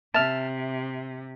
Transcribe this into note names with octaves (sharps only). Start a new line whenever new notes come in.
C3 E5 A5 F6